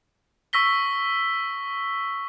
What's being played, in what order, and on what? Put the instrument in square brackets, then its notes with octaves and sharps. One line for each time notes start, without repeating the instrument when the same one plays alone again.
[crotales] C#6 E6 A#6 B6 G7